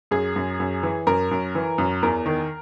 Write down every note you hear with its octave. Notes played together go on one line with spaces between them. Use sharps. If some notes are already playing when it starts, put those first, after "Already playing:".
F#2 G#4
F#2
F#2
E3
F#2 A#4
F#2
E3
F#2
E2 A#4
D#3